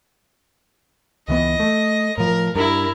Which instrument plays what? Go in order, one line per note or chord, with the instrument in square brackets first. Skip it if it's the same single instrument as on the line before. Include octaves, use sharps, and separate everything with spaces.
[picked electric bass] C#2 E3 B3 [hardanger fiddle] D#5
[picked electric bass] A3
[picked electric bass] A2 F3 [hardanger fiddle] A#4
[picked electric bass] G2 [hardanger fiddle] E4 A#4